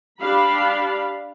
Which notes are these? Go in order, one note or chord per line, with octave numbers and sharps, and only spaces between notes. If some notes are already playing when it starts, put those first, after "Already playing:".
D4 G4 F5 B5